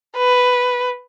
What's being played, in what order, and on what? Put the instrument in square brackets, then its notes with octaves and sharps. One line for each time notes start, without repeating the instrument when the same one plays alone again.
[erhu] B4